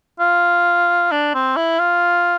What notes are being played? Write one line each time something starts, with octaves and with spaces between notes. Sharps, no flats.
F4
D4
C4
E4
F4